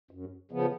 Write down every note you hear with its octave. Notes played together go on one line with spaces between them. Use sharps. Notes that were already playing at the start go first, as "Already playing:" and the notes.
F#2
C#3 F3 B3